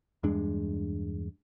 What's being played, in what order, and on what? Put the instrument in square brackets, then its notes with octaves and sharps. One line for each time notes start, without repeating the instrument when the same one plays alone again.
[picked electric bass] E2 G2 G#3 D4